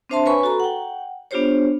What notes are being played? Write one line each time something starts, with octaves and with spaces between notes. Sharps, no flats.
C4 D4 C5 E5 A5 C6
B4 C#5 G#5 B5 C#6
F#4 A4 A#5
F#5 G5
B3 D4 F4 G4 C5 C#5